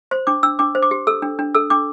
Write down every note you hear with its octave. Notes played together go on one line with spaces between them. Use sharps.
C5 C6
D4 D6
D4 E6
D4 D6
C5
D6
G4
A4 E6
D4
D4
A4 E6
D4 D6